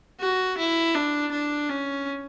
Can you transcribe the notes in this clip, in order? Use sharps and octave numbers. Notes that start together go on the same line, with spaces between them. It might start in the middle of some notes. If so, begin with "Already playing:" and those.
F#4
E4
D4
D4
C#4